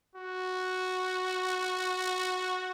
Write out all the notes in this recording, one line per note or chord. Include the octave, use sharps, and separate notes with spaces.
F#4